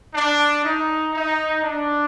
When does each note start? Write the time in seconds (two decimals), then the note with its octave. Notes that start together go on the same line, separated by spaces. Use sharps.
0.14 D4
0.64 D#4
1.14 D#4
1.63 D4